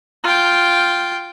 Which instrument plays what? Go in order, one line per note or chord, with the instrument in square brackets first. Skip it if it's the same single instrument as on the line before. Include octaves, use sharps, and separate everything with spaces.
[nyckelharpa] F4 G5